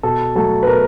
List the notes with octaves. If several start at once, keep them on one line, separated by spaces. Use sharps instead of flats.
B2 A4
F#3 A3 A4
B4
B2 A#4